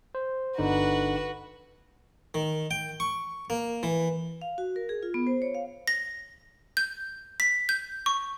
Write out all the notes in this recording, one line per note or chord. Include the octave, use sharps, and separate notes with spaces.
C5
G1 D3 D#4 F#4 B4
D#3
G5
C#6
A#3
E3
F5
F#4
A#4
G#4
F4
B3
C5
C#5
F5
A#6
G6
B6
G6
C#6